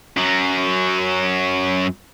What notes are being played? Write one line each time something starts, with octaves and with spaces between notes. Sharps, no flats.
F#2 F#3